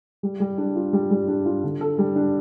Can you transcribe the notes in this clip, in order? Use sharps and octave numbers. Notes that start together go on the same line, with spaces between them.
G3
G3
D4
F4
G3
G3
D4
F4
D3
A4
G3
D4